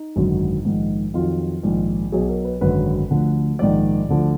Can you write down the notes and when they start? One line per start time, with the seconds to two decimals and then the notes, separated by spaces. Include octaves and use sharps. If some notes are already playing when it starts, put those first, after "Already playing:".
Already playing: D#4
0.16 G#1 F#2 D3 F#3
0.65 A#1 G#2 D#3
1.14 F2 D#3 F#3 F4
1.63 A#1 G#2 D#3
2.12 B1 B2 F#3 G#4
2.29 A#4
2.45 B4
2.61 G#1 F#2 D3 F#3 B4
3.11 D2 D3 F3
3.59 A#1 G#2 D#3 D5
4.09 D2 D3 F3